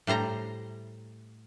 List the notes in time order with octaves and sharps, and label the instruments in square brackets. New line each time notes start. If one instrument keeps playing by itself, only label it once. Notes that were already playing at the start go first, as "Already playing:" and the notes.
[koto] A2 G3 C5 A#5